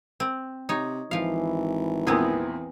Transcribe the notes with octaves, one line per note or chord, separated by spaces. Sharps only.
C4
C3 D#4 C#5
G#1 E3 F3 F5
E2 A#2 B3 C4 G#4